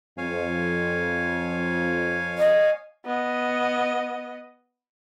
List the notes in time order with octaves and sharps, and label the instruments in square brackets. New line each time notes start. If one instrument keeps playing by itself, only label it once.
[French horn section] F2 [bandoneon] C#5 F5 G#5
[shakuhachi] D#5
[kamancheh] B3 D#5